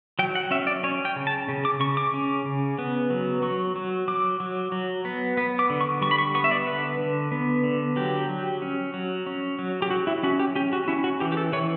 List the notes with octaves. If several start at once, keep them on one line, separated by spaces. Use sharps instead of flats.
F#3 G5
F#5
C#4 E5
D5
C#4 C#5
G5
C#3
A5
C#3
D6
C#3 C#6
D6
C#4
C#3
B3
F#3
F#3 C#6
F#3
F#3 D6
F#3
F#3
B3
B3
D6
D3
C#6
G3 C#6
B5
C#6
B3 C#6
E5
D5
D3 B4
D3
B3
D3
F#3 G4
F#3
C#4
F#3
C#4
F#3
G4
F#3 F#4
E4
C#4 F#4
G4
C#4 G4
F#4
C#4 E4
F#4
E3 G4
G4
A4
E3 C#5